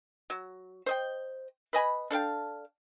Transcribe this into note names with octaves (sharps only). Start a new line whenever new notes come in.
F#3
C5 D#5 G5
B4 D#5 G#5 B5
D4 A4 F5 G5